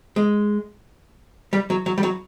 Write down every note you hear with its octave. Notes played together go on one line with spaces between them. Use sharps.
G#3
G3
F#3
F#3
G3
F#3